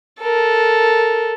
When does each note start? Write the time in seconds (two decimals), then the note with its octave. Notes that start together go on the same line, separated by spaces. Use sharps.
0.22 A4 A#4